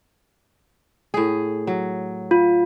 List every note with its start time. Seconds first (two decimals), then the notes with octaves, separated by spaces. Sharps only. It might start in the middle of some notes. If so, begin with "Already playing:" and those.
1.14 A2 G#4
1.67 F#3
2.31 F4